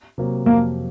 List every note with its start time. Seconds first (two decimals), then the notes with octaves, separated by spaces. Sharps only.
0.18 C3 F#3 A#3
0.46 F2 A#3